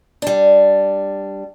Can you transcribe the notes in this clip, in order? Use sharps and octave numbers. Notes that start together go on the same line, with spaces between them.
G3 D4